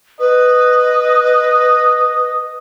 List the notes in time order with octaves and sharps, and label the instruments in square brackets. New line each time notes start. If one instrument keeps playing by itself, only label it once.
[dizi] B4 [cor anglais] D#5